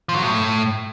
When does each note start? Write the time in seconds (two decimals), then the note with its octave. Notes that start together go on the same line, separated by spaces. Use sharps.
0.09 F3
0.16 F#3
0.22 A2